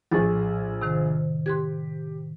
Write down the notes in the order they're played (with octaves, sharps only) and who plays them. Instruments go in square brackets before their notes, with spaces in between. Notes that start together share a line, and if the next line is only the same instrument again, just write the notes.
[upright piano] A#1 G#4 [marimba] A2 A6
[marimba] C3 D#3 C5
[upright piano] G4 [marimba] C6 F#6 G#6